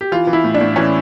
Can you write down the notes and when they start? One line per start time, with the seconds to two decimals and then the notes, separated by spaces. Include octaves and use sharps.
0.01 G4
0.12 E3 F4
0.27 E3
0.33 E4
0.44 A2
0.54 D4
0.61 A2
0.76 E3 C#4